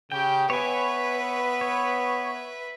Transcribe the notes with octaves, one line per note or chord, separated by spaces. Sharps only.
C#3 G4 G5
B3 B4 C#5 E5 G#5
C#5